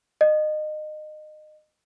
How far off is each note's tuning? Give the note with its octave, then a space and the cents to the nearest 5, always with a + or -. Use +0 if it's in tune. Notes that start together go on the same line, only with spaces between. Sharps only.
D#5 -25